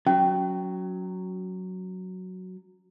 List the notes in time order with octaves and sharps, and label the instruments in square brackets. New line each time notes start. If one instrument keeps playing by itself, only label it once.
[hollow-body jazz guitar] F#3 [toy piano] C#4